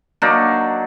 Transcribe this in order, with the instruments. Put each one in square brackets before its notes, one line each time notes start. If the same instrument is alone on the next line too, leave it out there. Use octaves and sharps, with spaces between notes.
[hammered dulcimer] F#3 A#3 D4 D#4